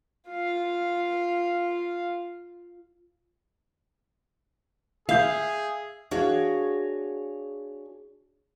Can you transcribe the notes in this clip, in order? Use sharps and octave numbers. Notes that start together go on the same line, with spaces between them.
F4 F5
G#4 E5 F5 G6
D4 F#4 G#4 C#5 F5